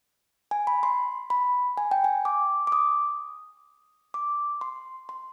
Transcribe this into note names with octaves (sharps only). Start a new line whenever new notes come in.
G#5
B5
C6
B5
G#5
G5
G#5
D6
D6
D#6
D6
C6
C6